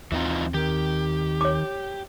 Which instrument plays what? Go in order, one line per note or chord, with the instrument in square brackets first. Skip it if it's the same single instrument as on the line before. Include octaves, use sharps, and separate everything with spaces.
[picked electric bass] D#2 G#3 C4 [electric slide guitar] E3 D#4 F4
[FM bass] D#3 [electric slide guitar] G4
[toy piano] C#5 D6